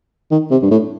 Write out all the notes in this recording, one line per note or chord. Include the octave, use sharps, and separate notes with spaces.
D#3
C3
G2
A2